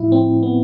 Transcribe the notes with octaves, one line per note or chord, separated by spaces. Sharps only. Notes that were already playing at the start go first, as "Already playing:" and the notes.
Already playing: A2 F3 E4
C4
B3